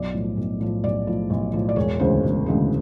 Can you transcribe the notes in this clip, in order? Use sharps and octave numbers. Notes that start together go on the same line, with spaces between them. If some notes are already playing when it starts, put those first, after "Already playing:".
Already playing: B1 D5
A2 F3
B1
A2 F3
B1 D5
A2 F3
B1
A2 F3
D5
E1 C#5
D2 C#3 E3 G#3 C5
E1
D2 C#3 E3 G#3